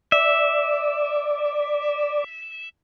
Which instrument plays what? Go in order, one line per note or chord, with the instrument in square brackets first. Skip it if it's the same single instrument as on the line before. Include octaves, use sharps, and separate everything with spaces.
[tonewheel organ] D5 [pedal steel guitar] E5